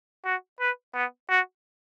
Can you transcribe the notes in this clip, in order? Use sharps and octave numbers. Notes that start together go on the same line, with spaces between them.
F#4
B4
B3
F#4